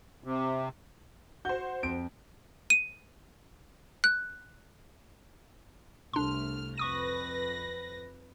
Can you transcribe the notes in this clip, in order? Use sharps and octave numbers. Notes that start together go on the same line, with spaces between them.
C3
F#4 C5 G6
F2 D7
D#7
F#6
C2 A3 D4 C6 F6
F2 B4 C#6 D#6 A#6 D#7